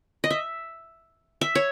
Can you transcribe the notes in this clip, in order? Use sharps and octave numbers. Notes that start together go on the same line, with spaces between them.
D#5
E5
E5
C#5